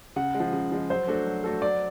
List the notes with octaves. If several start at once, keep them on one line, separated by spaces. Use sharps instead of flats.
C#3 F#5
G#3
F3
C#3
F3 G#3
F#3 C5
A3 D4 F#4 A4
F#3
A3 D4 F#4 A4
F#3 D5